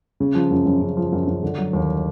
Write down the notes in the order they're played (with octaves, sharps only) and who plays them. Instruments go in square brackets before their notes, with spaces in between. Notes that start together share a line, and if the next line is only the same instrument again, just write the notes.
[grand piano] C#3
F3
F#2
F#2
C#3
F3
F#2
F#2
D3
F#3
D#2